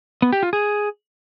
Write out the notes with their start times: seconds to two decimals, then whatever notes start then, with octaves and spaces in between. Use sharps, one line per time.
0.22 B3
0.33 G4
0.43 F4
0.53 G#4